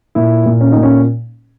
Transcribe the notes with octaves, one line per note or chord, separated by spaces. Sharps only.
A#2 E4
A#2
C#4
A#2 D#4
C#4